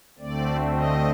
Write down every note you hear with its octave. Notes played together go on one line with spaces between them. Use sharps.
D2 D3 A3 C4 D5
D#5